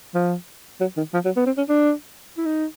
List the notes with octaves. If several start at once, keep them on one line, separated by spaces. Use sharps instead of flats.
F3
F#3
D#3
F3
F#3
B3
C4
C#4
D4
E4
D#4